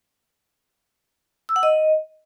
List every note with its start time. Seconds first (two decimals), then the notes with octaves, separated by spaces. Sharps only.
1.49 E6
1.56 F#5
1.63 D#5